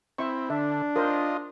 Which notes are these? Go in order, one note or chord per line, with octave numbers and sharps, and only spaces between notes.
C4 E4 E5 C#6
D3 D4 E5
F4 A#4 C5 D#5